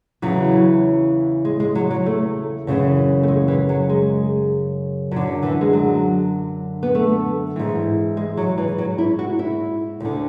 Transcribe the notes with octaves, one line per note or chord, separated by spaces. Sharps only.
E2 C#3 E3 F#3
G#3
G#3
F#3
F#3
A3
F#2 C#3 E3
A3
G#3
E3
F#3
G#3
F#2 D3 F#3
E3
G#3
F#3
B3
A3
G#2 E3
G#3
F#3
E3
F#3
E4
F#4
E4
D2 D3